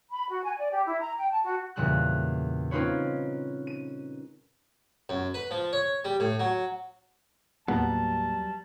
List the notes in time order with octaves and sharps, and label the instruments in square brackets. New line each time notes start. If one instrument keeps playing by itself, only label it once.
[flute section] B5
F#4
G#5
D5
G4
E4
A#5
G5
A5
F#4
[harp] E2 A#2 C#3 G3 F#6
C4 C#4 D#4 F4 B4 C#5
D#7
[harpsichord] F#2
B4
F3
C#5
G3
A2
F#3
[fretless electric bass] D#2 A2 A#3 [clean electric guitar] F#3 G3 A#5 [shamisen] B3 [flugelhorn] A5